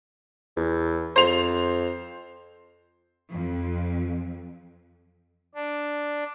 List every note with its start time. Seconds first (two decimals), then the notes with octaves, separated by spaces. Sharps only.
0.57 E2
1.16 F2 C5 F7
3.33 F2
5.55 D4